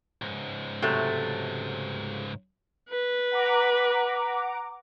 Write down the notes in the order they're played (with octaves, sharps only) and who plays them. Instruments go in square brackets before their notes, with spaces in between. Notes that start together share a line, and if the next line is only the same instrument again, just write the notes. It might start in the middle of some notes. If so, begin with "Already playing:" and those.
[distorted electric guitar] C#2 G#2
[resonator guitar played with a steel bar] C3 F#3 A3
[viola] B4
[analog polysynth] F#5 A#5 D6